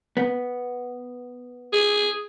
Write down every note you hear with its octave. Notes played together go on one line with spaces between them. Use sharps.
B3
G#4